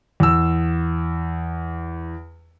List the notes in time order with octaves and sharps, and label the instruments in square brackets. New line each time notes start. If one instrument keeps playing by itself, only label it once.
[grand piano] E2 E6